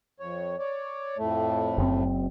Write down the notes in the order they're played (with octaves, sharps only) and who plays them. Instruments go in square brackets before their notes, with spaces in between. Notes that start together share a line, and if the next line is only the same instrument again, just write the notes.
[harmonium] F2 C#5
C#5 D5
F2 A2 A3
[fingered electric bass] F#1 F#2 C4